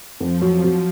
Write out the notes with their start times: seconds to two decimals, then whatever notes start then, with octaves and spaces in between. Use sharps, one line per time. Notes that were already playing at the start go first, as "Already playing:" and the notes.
0.20 F2 F3
0.42 F#3
0.64 F#3